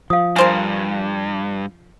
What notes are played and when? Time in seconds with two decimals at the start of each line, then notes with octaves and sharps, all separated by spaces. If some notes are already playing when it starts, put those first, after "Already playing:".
0.10 F3 F5 D#6
0.36 G2 A#4 C5 F5 G#5